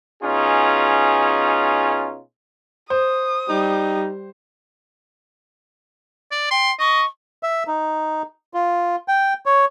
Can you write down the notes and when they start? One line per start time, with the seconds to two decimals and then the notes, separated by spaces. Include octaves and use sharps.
0.23 B2 C#4 D#4 F4 G#4
2.90 C5 D#6
3.49 G3 D#4
6.32 D5
6.51 G5 C6
6.79 D#5 C#6
7.43 E5
7.67 D#4
8.54 F4
9.08 G5
9.46 C#5